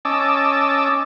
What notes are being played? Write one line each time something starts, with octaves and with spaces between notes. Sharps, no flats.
C#4 D#5 A5 D6 E6